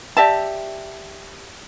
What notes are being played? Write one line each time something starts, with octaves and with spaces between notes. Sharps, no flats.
G4 D5 E5 A5